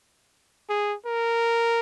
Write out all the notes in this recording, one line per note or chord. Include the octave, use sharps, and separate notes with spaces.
G#4
A#4